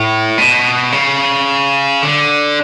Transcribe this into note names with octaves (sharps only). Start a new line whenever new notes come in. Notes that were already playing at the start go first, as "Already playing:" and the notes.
Already playing: A2
B2
C#3
D3